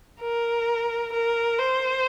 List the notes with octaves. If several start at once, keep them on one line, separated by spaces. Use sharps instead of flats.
A#4
A#4
C5